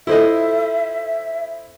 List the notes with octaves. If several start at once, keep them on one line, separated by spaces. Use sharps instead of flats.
E4 F4 A4 C5 D#5 E5